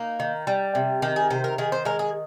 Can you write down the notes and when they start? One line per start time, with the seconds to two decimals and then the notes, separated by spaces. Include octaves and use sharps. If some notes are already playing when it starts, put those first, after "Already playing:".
Already playing: A#3 D#4
0.20 D#3
0.47 G3
0.75 C3
1.02 D#3 G4
1.16 G#4
1.30 C3 C5
1.44 A#4
1.58 D#3 G#4
1.72 C5
1.85 G#3 A#4
1.99 G#4